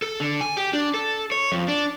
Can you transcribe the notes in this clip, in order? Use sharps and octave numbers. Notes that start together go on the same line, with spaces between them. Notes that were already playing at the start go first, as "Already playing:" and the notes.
A4
D3
G#5
G4
D4
A4
C#5
F2
D4